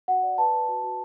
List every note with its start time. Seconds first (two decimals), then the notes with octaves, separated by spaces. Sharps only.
0.08 F#4 F#5
0.23 D5
0.38 B4 A5
0.53 B4
0.68 F#4
0.83 F#4